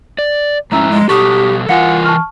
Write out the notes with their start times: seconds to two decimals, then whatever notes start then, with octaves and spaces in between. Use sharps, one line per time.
0.19 D5
0.72 F2 G#2 C#4 E4 A#5 E6
0.91 G#3
1.09 B2 G4 A4 C#6 D#6
1.69 E3 F4 A#4 F5 F#5 G#5 C#7
2.04 A5 C#6 F6